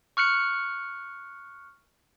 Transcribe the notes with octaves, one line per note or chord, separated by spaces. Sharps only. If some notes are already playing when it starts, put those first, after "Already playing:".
C#6 F6 F#6 C#7